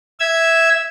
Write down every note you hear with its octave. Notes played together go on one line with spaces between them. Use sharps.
E5 E6 G#6